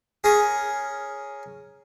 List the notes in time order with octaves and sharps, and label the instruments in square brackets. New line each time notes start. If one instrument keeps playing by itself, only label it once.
[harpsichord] C#4 G#4 A#4